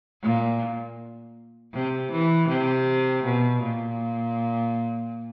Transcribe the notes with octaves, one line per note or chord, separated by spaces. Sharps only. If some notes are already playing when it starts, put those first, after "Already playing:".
A#2
C3
E3
C3
B2
A#2